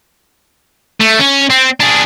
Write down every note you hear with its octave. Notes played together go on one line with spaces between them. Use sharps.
A3
C#4
C4
D4 G#4